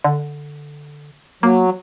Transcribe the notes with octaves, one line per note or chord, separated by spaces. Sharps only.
D3
F#3 A#3